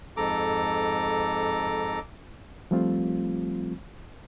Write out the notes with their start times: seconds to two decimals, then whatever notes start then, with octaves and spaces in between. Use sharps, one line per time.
0.17 F2 G#2 A4 A#5 D6
2.71 F3 G3 A3 C4 F4